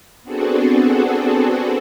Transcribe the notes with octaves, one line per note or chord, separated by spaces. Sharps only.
B3 C4 D4 F#4 G#4 A4